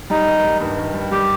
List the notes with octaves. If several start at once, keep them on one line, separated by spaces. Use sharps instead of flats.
G3 D#4
D#3
G3
G2
D#3
G3
G3 G4